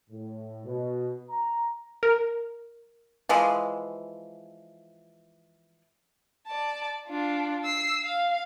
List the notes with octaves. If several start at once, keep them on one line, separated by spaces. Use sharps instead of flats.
A2
B2
A#5
A#4
E3 F3 G#3
D5 A5
D4 F4
E6 C7
F5